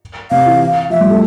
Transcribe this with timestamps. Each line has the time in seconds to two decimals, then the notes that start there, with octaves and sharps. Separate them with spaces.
0.31 C3 F5
0.46 E3
0.90 F3 E5
1.01 G3
1.10 A3